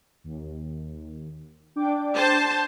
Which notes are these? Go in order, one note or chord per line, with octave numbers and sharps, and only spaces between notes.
D#2
D4 G5 D6
C5 A5